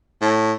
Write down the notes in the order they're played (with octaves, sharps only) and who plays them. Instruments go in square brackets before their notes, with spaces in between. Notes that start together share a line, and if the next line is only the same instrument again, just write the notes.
[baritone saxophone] A2